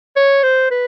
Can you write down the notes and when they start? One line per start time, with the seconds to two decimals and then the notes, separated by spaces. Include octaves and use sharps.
0.16 C#5
0.43 C5
0.71 B4